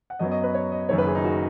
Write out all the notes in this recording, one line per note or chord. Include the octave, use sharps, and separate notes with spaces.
F#5
F#2 F#3 B3 D#5
D#5
B4
C#5
D#5
F#1 F#2 D#3 C#5
B4
G#4
D#4
F#4